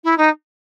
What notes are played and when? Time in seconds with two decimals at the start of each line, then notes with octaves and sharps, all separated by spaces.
0.04 E4
0.18 D#4